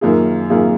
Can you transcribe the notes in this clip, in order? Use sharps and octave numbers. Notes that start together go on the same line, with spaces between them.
F#2 D#3 A#3 F4 G#4
F#2 D#3 A#3 F4 G#4